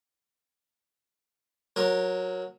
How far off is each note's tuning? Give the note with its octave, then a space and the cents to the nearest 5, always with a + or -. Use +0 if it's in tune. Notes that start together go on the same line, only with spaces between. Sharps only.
F#3 -15 A#4 +0